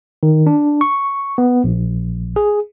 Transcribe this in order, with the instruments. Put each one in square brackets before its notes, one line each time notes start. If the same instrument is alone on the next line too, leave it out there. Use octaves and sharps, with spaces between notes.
[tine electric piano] D#3
D4
C#6
B3
A#1
G#4